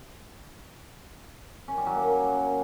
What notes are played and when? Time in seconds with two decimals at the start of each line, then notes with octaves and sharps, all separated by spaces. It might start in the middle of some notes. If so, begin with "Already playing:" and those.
1.68 C#4
1.77 G3
1.86 F#3
1.96 A#3